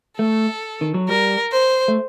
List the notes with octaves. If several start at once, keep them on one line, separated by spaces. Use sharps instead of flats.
A3 A4
D#3
F#3
G3 A#4
C5
A3